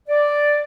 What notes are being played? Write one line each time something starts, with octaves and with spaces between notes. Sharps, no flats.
D5